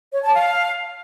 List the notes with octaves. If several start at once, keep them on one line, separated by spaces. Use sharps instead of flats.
C#5
A5
F5